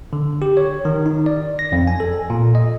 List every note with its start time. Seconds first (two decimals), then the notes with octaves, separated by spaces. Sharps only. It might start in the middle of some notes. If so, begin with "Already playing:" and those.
0.13 D3
0.42 G4
0.57 C#5
0.85 D#3
1.06 D#4
1.26 D5
1.59 A#6
1.72 F2
1.87 G#5
2.00 A4
2.30 A#2
2.55 D#5